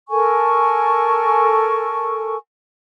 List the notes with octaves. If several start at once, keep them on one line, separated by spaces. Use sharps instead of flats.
A4 A#4 G#5 C#6